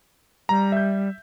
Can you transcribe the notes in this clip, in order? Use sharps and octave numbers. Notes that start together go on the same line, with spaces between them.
G3 A#5
E5 G6